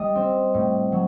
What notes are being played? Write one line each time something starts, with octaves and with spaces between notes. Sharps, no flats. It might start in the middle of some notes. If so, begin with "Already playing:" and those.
Already playing: G3 D#5
C4
A2
F#3